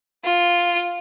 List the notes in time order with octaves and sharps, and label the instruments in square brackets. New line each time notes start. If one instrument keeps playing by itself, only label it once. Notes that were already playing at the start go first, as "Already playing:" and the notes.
[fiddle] F4